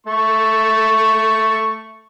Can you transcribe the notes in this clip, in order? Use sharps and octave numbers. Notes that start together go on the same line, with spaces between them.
A3 C#6